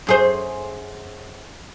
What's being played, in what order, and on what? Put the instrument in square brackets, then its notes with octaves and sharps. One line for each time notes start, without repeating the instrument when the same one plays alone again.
[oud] F#2 G#4 C5